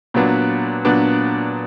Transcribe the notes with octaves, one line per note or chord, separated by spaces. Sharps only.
A#2 F#3 B3 D4
A#2 F#3 B3 D4